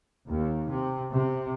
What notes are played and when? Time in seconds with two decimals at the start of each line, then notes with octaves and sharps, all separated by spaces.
0.25 D#2
0.69 C3
1.14 C3